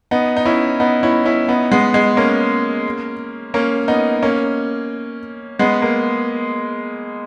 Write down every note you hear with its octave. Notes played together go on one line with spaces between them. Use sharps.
B3 D#4
D#4
C#4 E4
B3 D#4
C#4 E4
C#4 E4
B3 D#4
G#3 B3
G#3
A#3 C#4
A#3 C#4
B3 D#4
A#3 C#4
G#3 B3
A#3